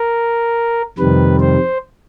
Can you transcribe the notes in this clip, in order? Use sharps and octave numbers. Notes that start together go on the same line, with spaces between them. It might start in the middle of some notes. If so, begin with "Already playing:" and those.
Already playing: A#4
F2 C3 D#3 G3 B4
C5